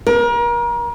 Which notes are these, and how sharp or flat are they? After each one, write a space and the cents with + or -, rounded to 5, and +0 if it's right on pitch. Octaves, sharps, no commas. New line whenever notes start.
A#4 +35